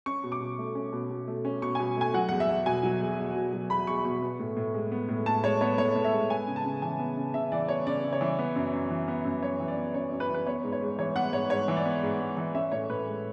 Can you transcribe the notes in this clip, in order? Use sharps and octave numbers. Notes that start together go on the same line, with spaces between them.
C#4 C#6
B2
D6
B2
A3
C#4
B2
B2
A3
C#4
B2 C#6
G#5
B2
A3 G#5
F#3 F#5
E2 F#5
E5
E2
B2 G#5
F#3
E2
E2
B2
F#3
E2 B5
E2 C#6
B2 C#6
B3
A2
A2
G#3
B3
A2
A2 A5
G#3 C#5
B3 C#5
A2 C#5
A2
E5
G#3
B3 G#5
C#3
A5
C#3
E3 G#5
B3
C#3
C#3 E5
E3 D5
B3 C#5
C#3 D5
C#3
C#5
E3
B3
F#2
F#2
E3
B3
F#2
F#2 C#5
E3
D5
B3
F#2 C#5
F#2
B4
E3
B4
B3 C#5
G#2
C#5
G#2
E3 C#5
B3 F#5
G#2 C#5
G#2 C#5
E3
D5
B3
G#2
G#2
E3
C#4 E5
A2 C#5
A2 B4
G#3